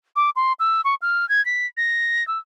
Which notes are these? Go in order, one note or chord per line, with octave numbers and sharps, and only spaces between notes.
D6
C6
E6
C#6
F6
G#6
B6
A#6
E6